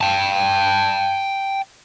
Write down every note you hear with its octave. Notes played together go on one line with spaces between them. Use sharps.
G5 A5